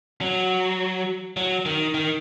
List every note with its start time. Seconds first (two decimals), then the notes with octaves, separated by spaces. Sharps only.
0.21 F#3
1.37 F#3
1.66 D#3
1.94 D#3